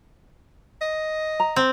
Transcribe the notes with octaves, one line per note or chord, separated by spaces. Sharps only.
D#5
A#5
C4